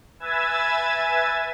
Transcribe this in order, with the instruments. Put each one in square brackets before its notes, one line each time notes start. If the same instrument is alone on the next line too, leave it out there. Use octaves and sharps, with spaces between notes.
[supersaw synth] B4 E5 G#5 E6 G#6 A6